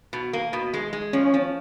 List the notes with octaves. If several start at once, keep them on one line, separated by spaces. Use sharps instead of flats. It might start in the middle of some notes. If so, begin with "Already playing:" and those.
B2
A#3
B2
G#3
G#3
F3 C#4
F3